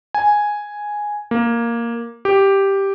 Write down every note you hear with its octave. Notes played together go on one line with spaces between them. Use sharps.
G#5
A#3
G4